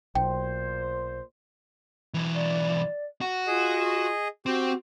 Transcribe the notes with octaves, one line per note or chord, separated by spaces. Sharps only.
B1 A#2 C5 G5
B1 E3
D5
F#4
F4 G#4 D#5
C4 F#4 G4